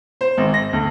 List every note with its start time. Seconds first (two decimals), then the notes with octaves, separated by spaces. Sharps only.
0.21 C5
0.38 G#1
0.54 A#6
0.73 D2